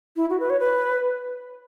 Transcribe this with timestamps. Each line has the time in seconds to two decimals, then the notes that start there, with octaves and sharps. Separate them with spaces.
0.16 E4
0.30 F#4
0.40 B4
0.50 C#5
0.60 B4